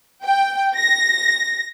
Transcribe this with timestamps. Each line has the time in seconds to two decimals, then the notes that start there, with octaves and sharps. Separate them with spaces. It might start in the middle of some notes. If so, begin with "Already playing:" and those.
0.24 G5
0.76 A#6